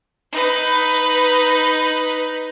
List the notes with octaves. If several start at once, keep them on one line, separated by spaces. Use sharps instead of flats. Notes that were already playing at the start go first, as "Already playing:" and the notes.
D#4 B4